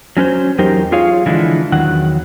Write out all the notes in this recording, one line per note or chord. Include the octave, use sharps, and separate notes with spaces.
F#3 C#4 B4 C5
E2 F#3 D#4 G4 A#4 C5
F4 G#4 C#5 F5
D3 E3 F3 G#3 D4 E4
E2 D#3 F#3 F#5